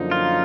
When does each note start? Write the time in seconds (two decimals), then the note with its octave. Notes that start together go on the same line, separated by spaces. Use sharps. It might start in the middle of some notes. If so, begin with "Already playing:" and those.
Already playing: F#2 D3 F3 A#3 D#4
0.11 F4